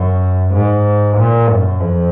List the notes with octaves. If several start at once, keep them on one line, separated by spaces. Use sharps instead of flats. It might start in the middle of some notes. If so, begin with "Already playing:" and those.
Already playing: F#2
G#2
A#2
F#2
F2